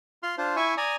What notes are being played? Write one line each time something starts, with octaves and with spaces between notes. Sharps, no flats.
F4 C6 F6
D4 F4 C5
E4 E5 G#5 C#6
D5 G#5 A#5 D#6